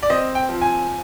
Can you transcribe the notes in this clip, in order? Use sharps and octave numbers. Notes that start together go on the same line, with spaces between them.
D5
C4 D#5
G5
F3
G#5